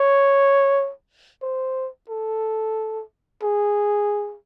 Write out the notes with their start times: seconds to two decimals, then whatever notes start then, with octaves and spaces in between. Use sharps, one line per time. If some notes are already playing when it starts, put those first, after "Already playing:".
Already playing: C#5
1.42 C5
2.09 A4
3.43 G#4